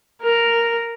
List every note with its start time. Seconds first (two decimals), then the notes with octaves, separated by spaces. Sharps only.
0.22 A#4